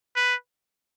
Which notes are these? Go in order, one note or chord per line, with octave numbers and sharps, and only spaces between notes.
B4